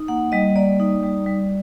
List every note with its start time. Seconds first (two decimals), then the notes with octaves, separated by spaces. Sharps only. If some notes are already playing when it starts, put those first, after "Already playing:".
Already playing: D#4
0.08 A#3 F#5
0.32 G3 D#5
0.56 A#3 D5
0.80 D#4
1.03 G3
1.26 G3